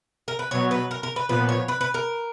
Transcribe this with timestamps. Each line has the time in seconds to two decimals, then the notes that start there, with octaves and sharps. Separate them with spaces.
0.28 A#4
0.39 B4
0.51 B2 F#3 B3 C#5
0.71 B4
0.91 A#4
1.03 A#4
1.16 B4
1.29 A#2 F3 B3 B4
1.49 C#5
1.68 B4
1.81 B4
1.94 A#4